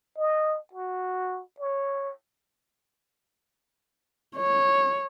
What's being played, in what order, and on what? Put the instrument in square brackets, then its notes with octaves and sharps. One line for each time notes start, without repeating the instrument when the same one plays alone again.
[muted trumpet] D#5
F#4
C#5
[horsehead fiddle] C#5